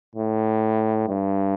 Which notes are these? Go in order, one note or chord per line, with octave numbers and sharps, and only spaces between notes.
A2
G2